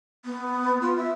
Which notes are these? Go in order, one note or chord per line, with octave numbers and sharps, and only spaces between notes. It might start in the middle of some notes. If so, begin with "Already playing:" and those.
B3
F4
E5